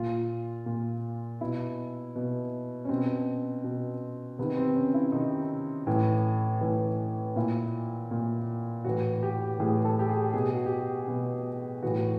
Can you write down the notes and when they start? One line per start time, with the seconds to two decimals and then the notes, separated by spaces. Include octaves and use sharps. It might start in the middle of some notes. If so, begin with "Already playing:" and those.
Already playing: A#2 F4
0.66 A#2
1.41 B2 E4
2.16 B2
2.85 C#4
2.89 B2 C4
3.64 B2
4.39 C3 D#3 B3
4.57 C4
4.76 C#4
4.94 E4
5.12 C3 D#3 D#4
5.87 A2 E3
6.61 A2 E3
7.36 A#2 E4
8.11 A#2
8.84 A2 E3 F#4
9.23 G4
9.59 A2 E3 G#4
9.85 A4
9.99 G4
10.09 G#4
10.33 B2 G#4
10.45 G4
10.55 F#4
10.66 G4
11.08 B2
11.83 A2 E3 F#4